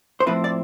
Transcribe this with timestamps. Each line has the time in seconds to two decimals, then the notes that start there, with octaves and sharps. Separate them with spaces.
0.20 C5
0.26 A2 F3 C4 E4 B4
0.44 D5